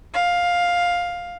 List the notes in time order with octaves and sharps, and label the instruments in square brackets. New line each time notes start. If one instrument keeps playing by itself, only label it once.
[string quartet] F5